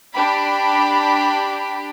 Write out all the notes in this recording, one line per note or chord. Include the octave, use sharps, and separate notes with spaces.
D4 G4 B5